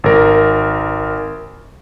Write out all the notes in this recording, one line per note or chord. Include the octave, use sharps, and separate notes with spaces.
G#1 A#4